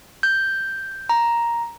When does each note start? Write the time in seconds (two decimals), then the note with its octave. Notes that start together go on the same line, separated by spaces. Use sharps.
0.23 G6
1.09 A#5